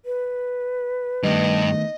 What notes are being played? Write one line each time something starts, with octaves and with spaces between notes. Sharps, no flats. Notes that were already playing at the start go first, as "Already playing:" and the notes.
B4
G2 D#3 A3 B3 D#5